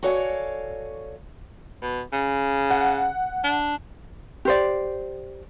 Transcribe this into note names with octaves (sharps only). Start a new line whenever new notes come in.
F#4 A4 C#5 D5 F5 G#5
B2
C#3
F#5
D4
G4 C5 D5